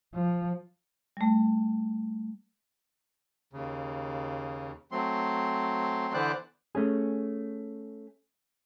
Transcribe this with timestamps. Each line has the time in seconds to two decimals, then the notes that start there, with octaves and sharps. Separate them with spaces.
0.14 F3
1.17 G3 A3
3.53 D#2 C#3
4.92 F#3 A3 C4 C6
6.14 D3 E3 B3 C5 D5 F#6
6.75 A3 C#4 G#4